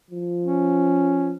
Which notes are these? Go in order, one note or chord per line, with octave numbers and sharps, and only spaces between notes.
F3
C#4